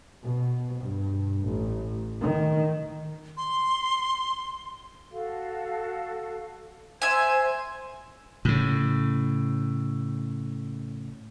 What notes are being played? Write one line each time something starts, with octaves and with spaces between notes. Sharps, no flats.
B2
G2
A1
D#3
C6
F#4 A4 F5
C5 E5 G#5 C6 G#6
A2 C#3